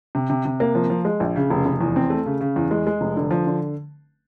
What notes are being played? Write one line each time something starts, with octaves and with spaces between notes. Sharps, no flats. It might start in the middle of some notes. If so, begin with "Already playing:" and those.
C3
C3
C3
A#3
F3
F3
G#3
A#1
C#3
F1
F1
E2
C4
A3
C#3
C#3
E2
G#3
G#3
F1
D3
F3
D3